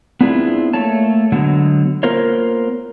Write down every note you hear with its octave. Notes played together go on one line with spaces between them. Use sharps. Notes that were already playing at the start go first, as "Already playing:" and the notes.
B3 C4 D4 E4 F4 G#4
A3 A#3 C#5 A5
D3 F#3 G#3 B3
A#3 B3 F4 A#4 C5 C#5